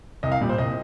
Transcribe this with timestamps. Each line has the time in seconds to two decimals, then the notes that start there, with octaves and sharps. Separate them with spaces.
0.23 C2 D#5
0.32 F5
0.41 A#2 G3
0.49 C5
0.58 C2 D#5